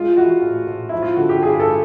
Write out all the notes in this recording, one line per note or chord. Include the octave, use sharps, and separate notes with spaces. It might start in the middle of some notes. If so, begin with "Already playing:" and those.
Already playing: G#3 F4
E3 F#4
A2
A2
F3 E4
F4
D3 F#4
G4
G2 G#4
A4
G#3